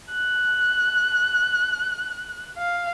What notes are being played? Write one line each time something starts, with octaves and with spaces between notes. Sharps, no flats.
F#6
F5